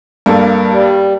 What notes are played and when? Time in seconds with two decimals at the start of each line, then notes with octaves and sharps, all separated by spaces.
0.26 G2 A#3 A4
0.69 G3